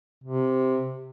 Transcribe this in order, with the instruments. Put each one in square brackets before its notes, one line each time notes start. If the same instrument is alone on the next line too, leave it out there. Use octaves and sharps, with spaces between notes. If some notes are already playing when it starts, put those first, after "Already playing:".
[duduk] C3